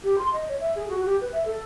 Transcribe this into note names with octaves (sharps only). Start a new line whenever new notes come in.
G4
C6
D#5
C#5
E5
G#4
F#4
G4
B4
E5
A4